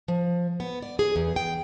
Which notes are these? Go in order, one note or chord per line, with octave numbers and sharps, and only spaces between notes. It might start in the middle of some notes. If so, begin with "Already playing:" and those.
F3
B3
D5
G#4
E2
G5